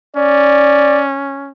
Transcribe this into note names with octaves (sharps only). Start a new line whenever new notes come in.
C#4 D5